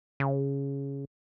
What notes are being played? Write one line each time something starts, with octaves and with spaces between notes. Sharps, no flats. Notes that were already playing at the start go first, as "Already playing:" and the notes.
C#3